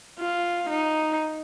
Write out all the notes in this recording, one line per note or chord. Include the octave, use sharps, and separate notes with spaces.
F4
D#4